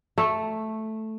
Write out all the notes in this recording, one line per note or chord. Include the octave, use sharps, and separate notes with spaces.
A3